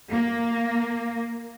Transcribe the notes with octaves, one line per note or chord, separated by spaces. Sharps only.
A#3